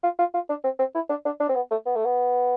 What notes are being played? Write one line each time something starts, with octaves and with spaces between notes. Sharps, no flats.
F4
F4
F4
D4
C4
C4
E4
D4
D4
D4
C4
B3
A3
B3
A3
B3